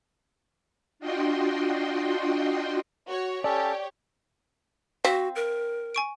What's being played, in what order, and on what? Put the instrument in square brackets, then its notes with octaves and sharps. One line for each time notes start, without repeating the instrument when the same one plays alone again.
[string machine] D4 F4 F#4 D#5 G5 C6
[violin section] F#4 C#5
[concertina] C#4 A4 A5 [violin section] G4 C#5 [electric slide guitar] D5
[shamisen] C4 [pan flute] F#4 [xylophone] F5 B6
[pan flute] A#4
[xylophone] G#5 C#6 D7